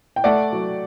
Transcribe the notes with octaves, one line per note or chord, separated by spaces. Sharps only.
G5
A3 D5 F#5
F#3